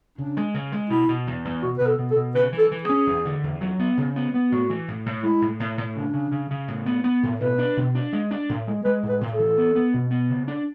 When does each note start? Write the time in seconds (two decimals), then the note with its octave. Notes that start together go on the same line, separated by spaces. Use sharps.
0.18 C#3 D4
0.37 G#3
0.54 C#3
0.72 G#3
0.90 B2 E4
1.09 B2
1.27 E2
1.45 E2
1.63 B2 F#4
1.78 B2 B4
1.86 A4
1.99 B2
2.11 A4
2.16 B2
2.35 C#3 B4
2.53 E3
2.58 A4
2.71 E3
2.84 G#4
2.89 C#4
3.07 E2
3.25 D3
3.43 E2
3.61 F#3
3.79 B3
3.98 C#3
4.16 B3
4.34 B3
4.51 A2 F#4
4.70 E3
4.88 A2
5.06 A2
5.23 G#3 E4
5.42 A2
5.60 A2
5.78 A2
5.96 C#3 D4
6.14 C#3
6.32 C#3
6.51 C#3
6.68 A2
6.86 B3
7.04 B3
7.23 A2
7.40 B2 B4
7.58 D4
7.77 B2
7.95 D4
8.13 G#3
8.31 D4
8.49 A2
8.67 G#3
8.85 G#3 B4
9.03 A2
9.09 B4
9.21 A2
9.33 A4
9.39 E3
9.58 B3
9.75 B3
9.94 B2
10.11 B3
10.29 C#3
10.48 D4